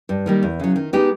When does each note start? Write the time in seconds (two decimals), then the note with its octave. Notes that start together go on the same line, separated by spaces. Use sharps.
0.09 G2
0.26 D#3 G3 A#3
0.43 E2
0.60 C#3 F#3
0.76 D#3
0.93 G#3 B3 D#4 G4